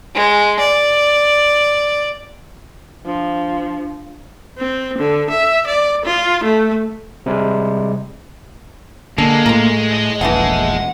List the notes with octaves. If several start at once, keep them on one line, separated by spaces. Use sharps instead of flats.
G#3
D5
F3 D4
C4
D3
E5
D5
F4
A3
C3 G3 G#3
D3 G#3 A#3 A4
A2 A3 F4 A#4
D#5
E1 A#1 E3 A3 D#5 F#5